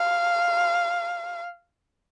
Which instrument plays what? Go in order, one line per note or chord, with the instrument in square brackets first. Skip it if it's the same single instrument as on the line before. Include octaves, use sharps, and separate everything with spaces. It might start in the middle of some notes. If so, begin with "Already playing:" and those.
Already playing: [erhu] F5